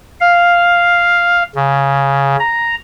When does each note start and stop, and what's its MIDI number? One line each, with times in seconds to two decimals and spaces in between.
0.20 1.43 77
1.55 2.36 49
2.39 2.75 82